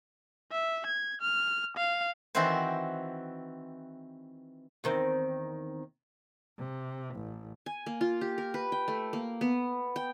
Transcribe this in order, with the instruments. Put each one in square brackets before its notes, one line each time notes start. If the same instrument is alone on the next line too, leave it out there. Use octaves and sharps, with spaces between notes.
[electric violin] E5
G#6
F6
F5
[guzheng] D#3 E3 C4 E4 F#4 C5
[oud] E2 D#3 C4
[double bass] C3
A1
[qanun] G#5
A#3
F4
G4
A#4
B4
G5
A3
A#3
B3
G5